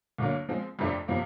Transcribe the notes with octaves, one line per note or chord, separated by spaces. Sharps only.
D2 D3 F#3 A#3
F3 G#3 C4
F2 C3 F3 A3 D4
C3 F3 A#3